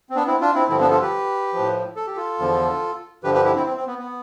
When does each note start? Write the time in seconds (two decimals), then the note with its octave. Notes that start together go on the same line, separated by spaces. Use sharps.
0.10 C4
0.16 B3 D4
0.26 C4 E4
0.41 D4 F4
0.54 C4 E4
0.69 G2 D3 F3 C4 E4
0.80 B3 D4
0.90 F4 A4
1.01 G4 B4
1.53 F3
1.58 A2
1.96 A4
2.07 G4
2.16 F4 A4
2.39 E2 D3 F3
3.23 G2 D3 F3 G4 B4
3.34 G4 B4
3.45 E4 G4
3.56 C4 E4
3.66 C4
3.77 C4
3.87 B3
3.98 B3